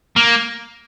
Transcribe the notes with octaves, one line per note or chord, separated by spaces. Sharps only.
A#3